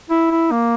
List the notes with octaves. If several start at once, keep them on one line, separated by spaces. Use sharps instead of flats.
E4
E4
A#3